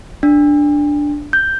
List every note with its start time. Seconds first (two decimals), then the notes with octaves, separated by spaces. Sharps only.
0.23 D4
1.33 G6